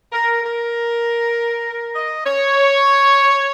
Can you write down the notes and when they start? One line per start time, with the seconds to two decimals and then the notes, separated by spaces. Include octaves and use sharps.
0.11 A#4
0.42 A#4
1.95 D#5
2.25 C#5